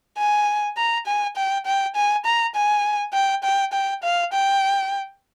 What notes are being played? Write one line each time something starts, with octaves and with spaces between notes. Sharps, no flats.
G#5
A#5
G#5
G5
G5
G#5
A#5
G#5
G5
G5
G5
F5
G5